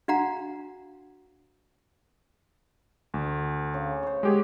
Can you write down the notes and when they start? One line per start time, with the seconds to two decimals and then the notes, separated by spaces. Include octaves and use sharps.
0.08 D4 F#4 F5 F#5 A#5
3.14 D2 C#6
3.74 C#3
4.03 C5 C#5
4.23 G#3 B3 G4 G#4